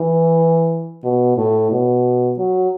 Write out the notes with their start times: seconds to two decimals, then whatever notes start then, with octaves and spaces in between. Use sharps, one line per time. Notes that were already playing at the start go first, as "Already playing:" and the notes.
Already playing: E3
1.04 B2
1.37 A2
1.71 B2
2.38 F#3